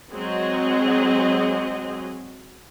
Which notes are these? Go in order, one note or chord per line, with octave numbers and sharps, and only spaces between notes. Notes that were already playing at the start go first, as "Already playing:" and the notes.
F#3 G#3 C4 F#4 G#4 D#5